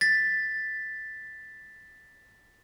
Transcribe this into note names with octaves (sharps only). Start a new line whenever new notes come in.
A6 B6